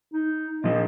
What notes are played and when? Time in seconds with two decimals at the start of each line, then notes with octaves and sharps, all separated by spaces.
0.13 D#4
0.64 A#2 F3 D#5